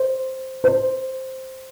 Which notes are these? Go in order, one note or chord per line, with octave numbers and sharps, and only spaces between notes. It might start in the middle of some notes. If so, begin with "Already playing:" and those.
Already playing: C5
C5